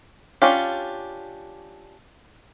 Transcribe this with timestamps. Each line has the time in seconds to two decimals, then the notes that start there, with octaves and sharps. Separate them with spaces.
0.42 C#4 D4 F4 G4